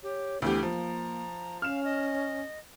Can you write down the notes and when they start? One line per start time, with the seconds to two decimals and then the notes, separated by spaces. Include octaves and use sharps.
0.03 G4 C#5
0.42 D2 E3 B3 G4 C5
0.63 F3 A#3 A#5
1.62 C#4 F5 F6 E7
1.84 D#5